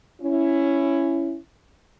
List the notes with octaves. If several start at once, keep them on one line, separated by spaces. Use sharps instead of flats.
C#4 E4